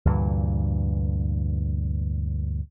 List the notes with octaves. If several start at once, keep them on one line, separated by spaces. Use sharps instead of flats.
D2 G2 A#2 E3